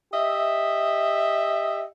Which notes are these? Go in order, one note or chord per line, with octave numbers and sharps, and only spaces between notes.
G4 D#5 E5